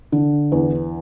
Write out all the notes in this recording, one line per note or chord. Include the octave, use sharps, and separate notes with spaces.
D3
E2